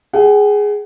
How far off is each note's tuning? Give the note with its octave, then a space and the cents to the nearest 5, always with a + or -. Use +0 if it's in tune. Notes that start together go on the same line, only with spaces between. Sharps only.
G#4 +0 F#5 +45